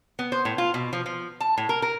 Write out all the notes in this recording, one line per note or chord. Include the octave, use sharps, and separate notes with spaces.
B3
C5
A2
F4
B2
F3
F3
A5
A2
A#4
A#4